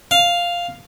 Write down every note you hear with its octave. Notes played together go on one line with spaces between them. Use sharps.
F5